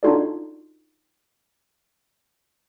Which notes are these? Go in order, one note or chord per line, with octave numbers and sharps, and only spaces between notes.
D4 D#4 F4 F#4 A4 D5